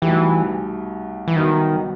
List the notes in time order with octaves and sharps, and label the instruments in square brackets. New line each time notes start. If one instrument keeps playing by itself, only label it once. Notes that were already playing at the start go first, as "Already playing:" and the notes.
[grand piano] C2 B2 A3 D#4 G4 [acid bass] E3
[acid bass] E3
[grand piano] C2 B2 F#3 B3 F#4 [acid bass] D#3